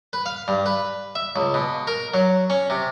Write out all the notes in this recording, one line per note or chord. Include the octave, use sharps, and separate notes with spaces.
B4
F5
G2
B4
E5
C#2
B2
A#4
F#3
C#4
C3